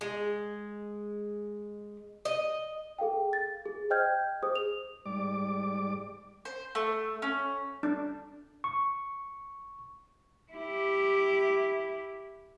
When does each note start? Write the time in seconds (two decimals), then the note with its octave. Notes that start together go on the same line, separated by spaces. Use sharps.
0.01 G#3
2.25 D#5
2.99 G#4 A4 F5 G5
3.33 A6
3.66 G#4
3.90 C5 D#5 G5 F6 G6 G#6
4.43 G#4 C5 D#6
4.56 F7
5.06 G#2 G3 D5 D6
6.45 C5
6.75 A3
7.22 C#4
7.83 D4
8.64 C#6
10.53 E4 G4